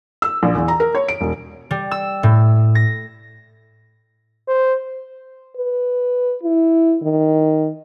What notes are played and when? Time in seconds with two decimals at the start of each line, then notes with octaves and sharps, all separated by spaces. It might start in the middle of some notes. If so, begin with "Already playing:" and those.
0.22 E6
0.43 A#1
0.55 E2
0.68 A#5
0.80 A#4
0.95 C#5
1.08 D7
1.21 E1
1.71 G3
1.91 E6
2.23 A2
2.75 A#6
4.48 C5
5.56 B4
6.43 E4
7.02 D#3